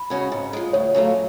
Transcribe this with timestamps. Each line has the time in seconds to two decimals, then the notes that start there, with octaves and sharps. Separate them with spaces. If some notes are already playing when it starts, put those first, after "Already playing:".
Already playing: B5
0.10 C#3 G#3 C#4 F#4
0.32 G#2
0.53 F3 G#3
0.73 D2 C#5
0.94 C#3 F#3 A3 F4